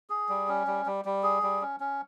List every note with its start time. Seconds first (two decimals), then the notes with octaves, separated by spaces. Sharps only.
0.10 G#4
0.29 G3
0.48 C#4
0.67 G3
0.86 G3
1.05 G3
1.23 G#4
1.43 G3
1.61 C#4
1.80 C#4